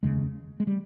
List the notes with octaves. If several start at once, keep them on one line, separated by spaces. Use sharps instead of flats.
F1 D#2 C#3 G#3
G#3
G3